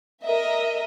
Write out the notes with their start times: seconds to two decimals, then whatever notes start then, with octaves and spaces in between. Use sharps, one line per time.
0.23 A#4 D#5 E5